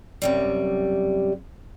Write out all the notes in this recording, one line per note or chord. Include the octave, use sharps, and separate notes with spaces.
F#2 C3 G3